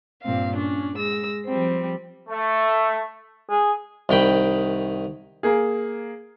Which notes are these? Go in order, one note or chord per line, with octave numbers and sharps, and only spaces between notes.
G2 A#2 C4 F5
C#4 D4
G#3 E6 A#6
F3 G3 C4
A3
G#4
C2 D#3 G5 B5
A#3 G#4